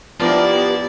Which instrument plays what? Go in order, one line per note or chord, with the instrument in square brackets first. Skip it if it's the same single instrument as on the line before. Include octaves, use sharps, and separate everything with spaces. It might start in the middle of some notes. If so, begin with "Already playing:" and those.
[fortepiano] F3 [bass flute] B3 [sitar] D4 G4 A#4 [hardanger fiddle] E4 D5